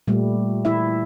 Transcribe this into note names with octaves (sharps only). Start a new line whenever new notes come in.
A#2 G3 A3
E4 E5